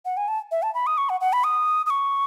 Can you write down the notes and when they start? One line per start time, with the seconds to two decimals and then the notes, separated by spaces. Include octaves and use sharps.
0.05 F#5
0.17 G#5
0.28 A5
0.51 E5
0.63 A5
0.74 B5
0.87 D#6
0.98 C#6
1.09 F#5
1.21 F#5
1.33 B5
1.44 D#6
1.86 D#6
1.90 C#6